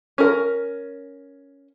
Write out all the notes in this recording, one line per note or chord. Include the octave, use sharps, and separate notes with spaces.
C#4 A#4